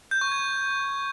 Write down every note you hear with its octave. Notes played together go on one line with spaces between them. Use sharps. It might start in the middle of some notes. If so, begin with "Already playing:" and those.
G6
C#6
G#6